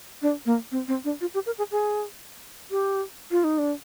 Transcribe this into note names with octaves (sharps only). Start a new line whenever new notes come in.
D4
A#3
C4
C4
D4
F4
G4
A#4
G#4
G#4
G4
F4
D#4
D4